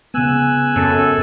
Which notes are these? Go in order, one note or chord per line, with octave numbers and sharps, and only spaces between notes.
C#3 B3 G#5 E6 F#6
F#2 C#4 A4